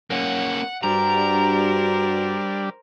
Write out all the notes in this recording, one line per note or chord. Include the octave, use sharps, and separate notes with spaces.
A#3 C#4 F#5
G2 G3 D4 F#4 A#4 C5 A#5